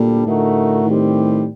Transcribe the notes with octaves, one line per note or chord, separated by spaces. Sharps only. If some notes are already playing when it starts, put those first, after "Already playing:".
Already playing: D2 A#2 G3 D4 A4
A2 D3 A3 D#4 F#4 A#4
D#3 G3 C4 G4